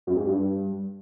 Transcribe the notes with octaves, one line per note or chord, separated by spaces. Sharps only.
F#2
G#2
G2